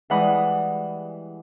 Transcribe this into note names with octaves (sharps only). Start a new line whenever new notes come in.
E3 G3 G#3 F#5 B5 D#6